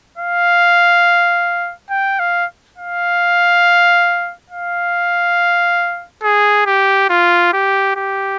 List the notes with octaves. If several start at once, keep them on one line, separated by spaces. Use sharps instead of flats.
F5
G5
F5
F5
F5
G#4
G4
F4
G4
G4